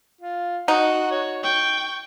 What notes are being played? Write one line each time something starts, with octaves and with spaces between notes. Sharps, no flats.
F4
D#4 F#4 F#5
C#5
G5 C#6